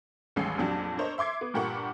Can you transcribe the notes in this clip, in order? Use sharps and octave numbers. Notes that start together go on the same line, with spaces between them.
A1 D#2 G3 G#3 C#4 C7
A#1 F2 F#3 D4 G4
D4 A4 A#4 C5 C#5 D#5
E5 C6 D6 G#6 C7
B3
G2 A#2 G4 A#4 F#5 C#6